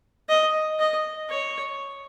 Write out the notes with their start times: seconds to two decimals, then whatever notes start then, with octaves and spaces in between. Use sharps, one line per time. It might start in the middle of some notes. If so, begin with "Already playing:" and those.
0.29 D#5
0.79 D#5
1.29 C#5